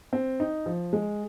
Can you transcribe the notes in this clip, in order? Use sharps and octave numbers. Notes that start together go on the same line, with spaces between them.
C4
D#4
F3
G#3